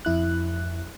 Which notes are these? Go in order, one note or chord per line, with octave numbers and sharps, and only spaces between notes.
F2 E4 F#6